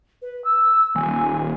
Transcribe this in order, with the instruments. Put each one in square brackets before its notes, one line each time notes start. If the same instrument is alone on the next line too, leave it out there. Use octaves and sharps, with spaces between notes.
[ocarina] B4
E6
[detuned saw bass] D#1 [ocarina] G#5